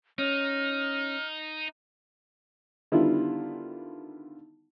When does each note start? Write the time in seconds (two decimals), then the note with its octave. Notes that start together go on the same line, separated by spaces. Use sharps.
0.18 C#4 D#4 F6
2.92 D3 D#3 G3 B3 E4 F4